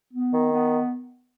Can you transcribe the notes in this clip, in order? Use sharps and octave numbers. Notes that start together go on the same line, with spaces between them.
B3
D#3
B3